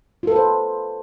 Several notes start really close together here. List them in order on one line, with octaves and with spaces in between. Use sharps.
F4 A4 B4 C5